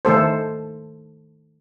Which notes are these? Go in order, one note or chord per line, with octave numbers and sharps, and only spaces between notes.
D#3 A3 A4 C5